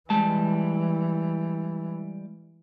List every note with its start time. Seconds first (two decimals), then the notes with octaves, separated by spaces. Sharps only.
0.10 E3 G3 G#3 A5